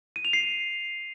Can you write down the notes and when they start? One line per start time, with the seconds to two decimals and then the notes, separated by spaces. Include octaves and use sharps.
0.16 D#7
0.25 F7
0.33 C7